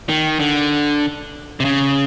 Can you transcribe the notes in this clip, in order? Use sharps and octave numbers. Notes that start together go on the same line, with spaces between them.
D#3
D3
C3
C#3